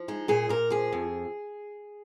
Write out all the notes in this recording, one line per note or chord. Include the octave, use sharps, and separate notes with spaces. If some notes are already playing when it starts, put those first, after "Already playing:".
Already playing: F3
G#3 D#4
A#2 G#4
A#2 A#4
F3 G#4
F2